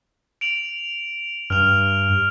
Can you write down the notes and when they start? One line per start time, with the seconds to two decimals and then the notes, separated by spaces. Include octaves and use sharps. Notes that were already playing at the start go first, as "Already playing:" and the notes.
0.41 D7 F7 F#7
1.50 G2 F6 F7